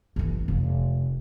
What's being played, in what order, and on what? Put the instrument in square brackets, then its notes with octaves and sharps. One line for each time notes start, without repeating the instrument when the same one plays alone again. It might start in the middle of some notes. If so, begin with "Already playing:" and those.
[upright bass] G1 E3
F1